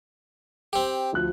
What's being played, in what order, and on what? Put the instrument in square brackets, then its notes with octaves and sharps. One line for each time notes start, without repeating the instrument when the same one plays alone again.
[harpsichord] C4 G4
[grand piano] D2 F3 F#6